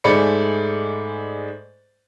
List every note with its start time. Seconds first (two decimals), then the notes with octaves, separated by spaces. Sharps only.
0.04 G#2 G#3 A3 D5 B5 C#7